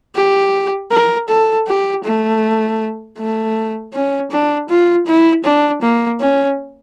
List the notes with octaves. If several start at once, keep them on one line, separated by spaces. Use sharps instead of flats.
G4
A#4
A4
G4
A3
A3
C#4
D4
F4
E4
D4
A#3
C#4